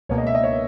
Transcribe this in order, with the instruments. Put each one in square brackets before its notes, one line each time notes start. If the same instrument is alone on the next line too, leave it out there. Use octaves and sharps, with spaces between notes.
[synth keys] C#2 B2 A#3 [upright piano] C#5
[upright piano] D#5
E5
D#5
C#5